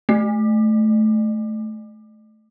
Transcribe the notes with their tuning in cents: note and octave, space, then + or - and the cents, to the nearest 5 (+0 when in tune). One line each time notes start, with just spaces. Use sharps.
A3 -20